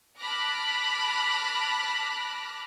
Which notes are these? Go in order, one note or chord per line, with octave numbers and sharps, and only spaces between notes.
A5 B5 D6 F6 F#6 A#6